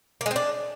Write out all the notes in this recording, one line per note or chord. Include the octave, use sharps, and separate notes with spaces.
A#3
G#3
C4
D4